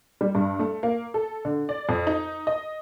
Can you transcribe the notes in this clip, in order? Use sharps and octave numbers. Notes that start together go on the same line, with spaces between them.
G3
G2
A3
A#3
A4
D3
D5
F2
D#4
D#5